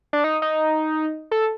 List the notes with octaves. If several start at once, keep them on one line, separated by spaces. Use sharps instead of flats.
D4
D#4
D#4
A4